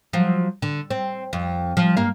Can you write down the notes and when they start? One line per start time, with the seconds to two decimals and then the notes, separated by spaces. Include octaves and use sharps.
0.13 F3 F#3
0.62 D3
0.91 C4
1.33 F2
1.77 F3
1.97 G2 A#3 F5